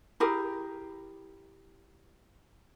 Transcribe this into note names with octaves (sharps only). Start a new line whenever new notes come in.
E4 G4 G#4 A#4